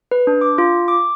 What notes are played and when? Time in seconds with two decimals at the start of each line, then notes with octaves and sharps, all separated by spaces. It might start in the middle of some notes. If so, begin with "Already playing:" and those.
0.11 B4
0.27 D4
0.41 D6
0.58 F4
0.88 D6